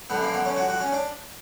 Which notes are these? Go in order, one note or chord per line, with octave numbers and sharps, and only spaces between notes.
F#2 D3 B3
A#3
B3
C#4
F#4
F#4
C#4
D4